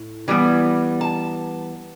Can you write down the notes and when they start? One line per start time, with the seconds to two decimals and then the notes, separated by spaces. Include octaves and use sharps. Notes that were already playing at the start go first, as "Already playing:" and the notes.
Already playing: A2
0.28 E3 G3 B3
1.01 A5